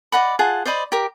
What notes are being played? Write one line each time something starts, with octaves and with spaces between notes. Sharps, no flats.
D5 D#5 F#5 B5
F4 G#4 F#5 A5
C5 D5 D#5 B5
G4 A#4